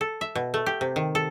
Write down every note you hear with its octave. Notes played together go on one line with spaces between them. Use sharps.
A4
E5
B2
A3
G4
C3
D#3
A4